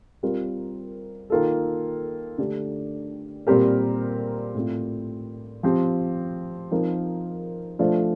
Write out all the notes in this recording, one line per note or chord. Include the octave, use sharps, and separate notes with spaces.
G3 C4 F4 A#4
D#3 A#3 F4 A4
D3 A3 D4 G4
A#2 G3 C4 G4 A#4
A2 A3 C4 F4
F3 C4 G4
F3 C4 D#4 A#4
F3 A3 D4 F4 C5